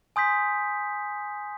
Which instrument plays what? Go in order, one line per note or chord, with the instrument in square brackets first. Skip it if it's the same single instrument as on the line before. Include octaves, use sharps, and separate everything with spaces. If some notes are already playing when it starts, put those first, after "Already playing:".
[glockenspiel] G#5 C6 D#6 G6 B6